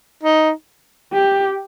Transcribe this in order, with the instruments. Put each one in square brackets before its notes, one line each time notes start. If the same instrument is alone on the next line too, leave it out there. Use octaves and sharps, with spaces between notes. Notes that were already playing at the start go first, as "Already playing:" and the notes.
[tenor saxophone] D#4
[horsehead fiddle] G4